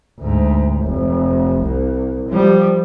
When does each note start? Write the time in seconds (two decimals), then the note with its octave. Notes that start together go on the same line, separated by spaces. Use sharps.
0.20 D2 G#2
0.84 F1
1.62 C2
2.29 F3 G3